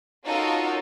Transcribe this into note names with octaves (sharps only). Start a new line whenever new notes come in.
C#4 D#4 F4 F#4 A4 A#4